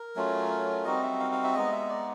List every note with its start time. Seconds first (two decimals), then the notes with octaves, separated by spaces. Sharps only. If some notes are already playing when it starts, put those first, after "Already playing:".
Already playing: A#4
0.16 F#3 A3 C#4 F4
0.85 G3 C4 D#4 F#4 D#5
1.03 E5
1.20 F5
1.32 F5
1.44 E5
1.55 G#3 B3 D#4 D#5
1.72 E5
1.89 D5